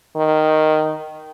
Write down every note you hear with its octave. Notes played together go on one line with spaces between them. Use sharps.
D#3